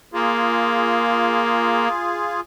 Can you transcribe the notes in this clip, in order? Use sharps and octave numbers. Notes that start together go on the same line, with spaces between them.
A#3 F4 G#4